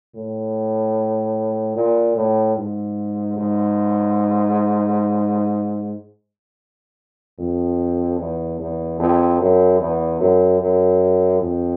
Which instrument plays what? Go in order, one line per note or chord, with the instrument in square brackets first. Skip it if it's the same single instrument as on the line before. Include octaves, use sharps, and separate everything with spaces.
[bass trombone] A2
A#2
A2
G#2
G#2
F2
E2
E2
F2
F#2
E2
F#2
F#2
F2